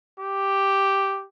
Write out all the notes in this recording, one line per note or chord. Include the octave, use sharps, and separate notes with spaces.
G4